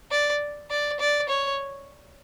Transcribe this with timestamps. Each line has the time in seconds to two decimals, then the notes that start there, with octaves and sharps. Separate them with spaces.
0.11 D5
0.71 D5
1.00 D5
1.29 C#5